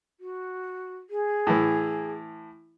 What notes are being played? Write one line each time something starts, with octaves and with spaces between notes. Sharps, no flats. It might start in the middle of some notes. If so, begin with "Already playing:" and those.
F#4
G#4
A2 E3